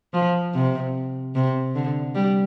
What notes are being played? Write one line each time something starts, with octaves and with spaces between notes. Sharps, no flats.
F3
C3
C3
D3
G3